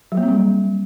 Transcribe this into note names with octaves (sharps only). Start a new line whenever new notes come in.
F#3
A#3
C4
G3